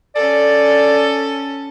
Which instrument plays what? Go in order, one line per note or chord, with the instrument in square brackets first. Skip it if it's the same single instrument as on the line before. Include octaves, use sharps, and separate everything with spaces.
[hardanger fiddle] C#4 A4 [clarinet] D5